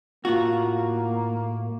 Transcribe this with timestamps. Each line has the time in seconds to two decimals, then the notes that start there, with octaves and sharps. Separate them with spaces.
0.25 A2 A#3 F4 F#4